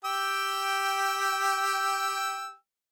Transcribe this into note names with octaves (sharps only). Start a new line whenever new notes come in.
G4 G5 E6